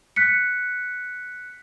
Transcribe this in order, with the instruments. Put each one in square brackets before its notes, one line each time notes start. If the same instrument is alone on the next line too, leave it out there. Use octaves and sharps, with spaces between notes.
[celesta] F#6 B6 C#7